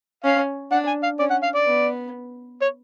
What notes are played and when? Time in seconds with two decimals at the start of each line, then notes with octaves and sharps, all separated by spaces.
0.24 C#4 F5
0.72 D4 F#5
0.87 G#5
1.03 F5
1.19 C#4 D5
1.30 F#5
1.43 F5
1.55 D5
1.66 B3
2.62 C#5